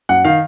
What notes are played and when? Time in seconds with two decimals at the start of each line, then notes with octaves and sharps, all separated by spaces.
0.09 F#2 F#5
0.25 D#3 F5